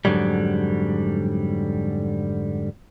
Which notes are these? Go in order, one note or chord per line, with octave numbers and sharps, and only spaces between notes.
F2 G#2 D3 D#3 F#3 G3